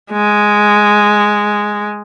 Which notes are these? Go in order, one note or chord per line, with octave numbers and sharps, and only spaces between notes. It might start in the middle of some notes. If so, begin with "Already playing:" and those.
G#3